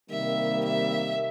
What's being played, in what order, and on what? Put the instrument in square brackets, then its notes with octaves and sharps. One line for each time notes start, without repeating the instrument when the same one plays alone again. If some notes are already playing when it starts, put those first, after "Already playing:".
[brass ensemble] C3 D#3 G3 A#3 [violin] E5
[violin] E5